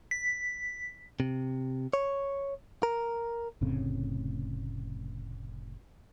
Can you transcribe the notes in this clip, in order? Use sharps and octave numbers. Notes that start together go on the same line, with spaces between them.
B6
C3
C#5
A#4
F1 A2 C#3 C4